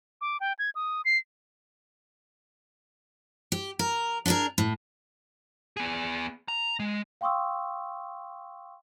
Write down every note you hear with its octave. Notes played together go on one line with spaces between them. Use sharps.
D6
G5
G#6
D#6
C7
G4
A#4
D4 F4 G4 G#4 A#4
A2
B3 G#4
A#5
G#3
F5 G5 C6 C#6 D#6 E6